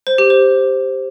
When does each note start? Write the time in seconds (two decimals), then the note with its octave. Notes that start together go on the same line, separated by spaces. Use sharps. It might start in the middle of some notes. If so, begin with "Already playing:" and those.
0.07 C5
0.18 G4
0.30 C5